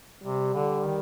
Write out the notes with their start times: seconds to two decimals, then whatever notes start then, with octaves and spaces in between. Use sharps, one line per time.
0.22 C3 G3
0.54 D3
0.85 D#3